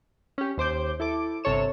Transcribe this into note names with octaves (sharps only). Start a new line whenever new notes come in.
C#4 G4
D#2 C5 D6 G6
E4 A4 D6
G1 C3 A4 C#5 E7